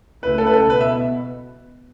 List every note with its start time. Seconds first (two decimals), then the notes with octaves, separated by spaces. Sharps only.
0.23 C#2 C#3 A3 E4 B4
0.38 A4
0.46 B4
0.54 A4
0.69 B2 B3 B4
0.81 E5